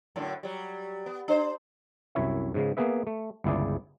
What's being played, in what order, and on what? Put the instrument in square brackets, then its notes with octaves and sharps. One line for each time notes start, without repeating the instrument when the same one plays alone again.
[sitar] F#2 A2 D3
F#3 G3
B3
D4 C5
[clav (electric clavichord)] C2 F#2 E4 C#5 E5
G#2 C#3 G#3
A#3 B3 G#4 B4 E5
A3
G1 C#2 E4 G#4 D5